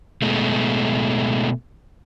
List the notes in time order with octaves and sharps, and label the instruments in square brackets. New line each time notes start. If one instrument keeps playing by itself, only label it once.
[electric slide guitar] B2 G#3 A3